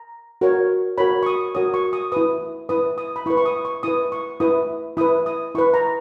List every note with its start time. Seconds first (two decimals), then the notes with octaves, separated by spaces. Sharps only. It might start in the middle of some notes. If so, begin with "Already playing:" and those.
Already playing: A#5
0.41 F#4 A#4 C#5
0.98 F#4 A#4 C#5 B5
1.23 C#6
1.26 D#6
1.55 F#4 A#4 C#5 D#6
1.74 C#6
1.93 D#6
2.12 E4 B4 D#6
2.69 E4 B4 D#6
2.98 D#6
3.16 B5
3.26 E4 C#6
3.30 B4
3.37 C#6
3.46 D#6
3.65 C#6
3.83 E4 B4 D#6
4.12 C#6
4.40 E4 B4 D#6
4.97 E4 B4 D#6
5.26 D#6
5.55 E4 B4 C#6
5.74 A#5